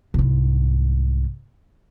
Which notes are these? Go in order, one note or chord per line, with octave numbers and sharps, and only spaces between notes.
C2 G#2